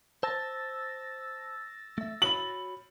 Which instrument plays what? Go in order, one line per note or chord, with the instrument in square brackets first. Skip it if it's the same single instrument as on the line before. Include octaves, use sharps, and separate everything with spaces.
[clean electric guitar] C5 A5 [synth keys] E6 A6 A#6
[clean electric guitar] A3 E5
[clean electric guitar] F#4 C#5 B5 [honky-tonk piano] F#7